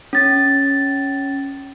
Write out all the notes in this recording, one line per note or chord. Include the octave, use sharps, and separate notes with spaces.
C#4 A6